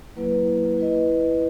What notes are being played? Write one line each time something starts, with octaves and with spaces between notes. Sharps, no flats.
F#3 A#3 E4 B4
E4 B4 D#5